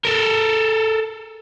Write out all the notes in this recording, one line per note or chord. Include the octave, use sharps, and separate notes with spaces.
A4 A#4